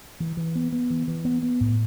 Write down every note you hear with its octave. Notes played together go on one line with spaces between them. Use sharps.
E3
E3
B3
B3
E3
E3
B3
B3
A2